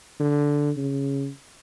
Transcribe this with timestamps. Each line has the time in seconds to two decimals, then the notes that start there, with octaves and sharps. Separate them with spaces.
0.20 D3
0.77 C#3